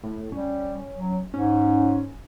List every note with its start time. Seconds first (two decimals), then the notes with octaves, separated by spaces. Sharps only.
0.03 A2
0.32 G3 C#4
0.95 F#3
1.34 G#2 C#4